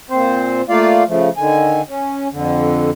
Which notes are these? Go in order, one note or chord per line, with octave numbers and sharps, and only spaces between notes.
A#2 C4 C5
A3 A#3 F4 D5 F5
C#3 F3 A3
D3 D#3 G#5
C#4
F2 D3